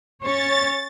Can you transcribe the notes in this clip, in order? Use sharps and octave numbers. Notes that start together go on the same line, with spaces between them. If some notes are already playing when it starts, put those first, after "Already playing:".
C#4 C#5 A6